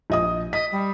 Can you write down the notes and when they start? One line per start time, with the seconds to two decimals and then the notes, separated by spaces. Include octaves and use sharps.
0.10 A#1 D#5 D#6
0.53 D#5 B6
0.72 G3